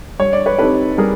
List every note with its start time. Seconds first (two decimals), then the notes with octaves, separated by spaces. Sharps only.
0.19 G3 C#5
0.33 D5
0.46 B4 C#5
0.58 C4 D#4 G4 A4 B4
0.98 G3 G#4 A#4